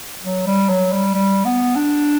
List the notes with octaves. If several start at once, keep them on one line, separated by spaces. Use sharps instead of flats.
F#3
G3
F#3
G3
G3
B3
D4